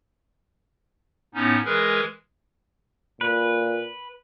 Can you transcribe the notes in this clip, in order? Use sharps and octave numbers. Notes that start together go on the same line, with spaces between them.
A2 B3 C#4 D#4
E3 G#3 G#4 A#4 B4
A#2 B4